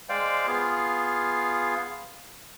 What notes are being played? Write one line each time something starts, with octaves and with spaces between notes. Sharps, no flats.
G#3 C5 D5 F5 G5
B3 F4 G#4 F5